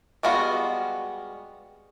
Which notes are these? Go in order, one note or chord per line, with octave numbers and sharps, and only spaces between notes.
G3 G#3 B3 F4 F#4